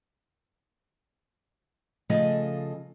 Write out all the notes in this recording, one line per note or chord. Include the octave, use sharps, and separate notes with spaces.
C#3 F3 A3 D#5 G#5 A5